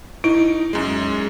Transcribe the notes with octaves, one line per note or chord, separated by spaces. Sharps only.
D#4 E4
F#2 G#3